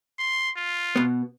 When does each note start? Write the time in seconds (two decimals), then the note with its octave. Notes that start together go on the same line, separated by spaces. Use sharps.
0.19 C6
0.57 F4
0.96 B2 B3